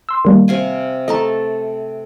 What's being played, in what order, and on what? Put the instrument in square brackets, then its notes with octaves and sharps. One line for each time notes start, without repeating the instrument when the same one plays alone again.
[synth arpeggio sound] C6 E6
D#3 G3 A#3
[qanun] C3 F5 G#5
[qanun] A3 A4 A5 [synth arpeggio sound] D#5 A#5